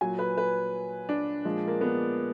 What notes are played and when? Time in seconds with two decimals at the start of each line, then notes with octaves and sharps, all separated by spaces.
0.01 A#2 F#3 G#5
0.19 B4
0.37 B4
1.09 D4
1.45 A#2 F3 G#3
1.67 A#3
1.81 B3